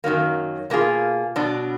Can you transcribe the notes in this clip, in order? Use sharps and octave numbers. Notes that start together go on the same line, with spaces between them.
F#2 D#3 F#3 A#3
B2 A#3 F4 G#4
B2 F#3 D4